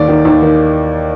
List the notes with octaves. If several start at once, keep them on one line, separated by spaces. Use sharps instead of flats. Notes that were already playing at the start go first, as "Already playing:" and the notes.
Already playing: D#2 D5
D#3
D#2
D#3